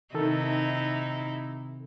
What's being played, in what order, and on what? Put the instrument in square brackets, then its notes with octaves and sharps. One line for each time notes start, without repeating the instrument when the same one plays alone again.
[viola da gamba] C3 D#4 E4 [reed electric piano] D#3 A4